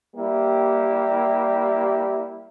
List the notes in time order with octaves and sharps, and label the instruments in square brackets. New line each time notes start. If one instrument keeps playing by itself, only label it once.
[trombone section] G3 A#3 E4 G4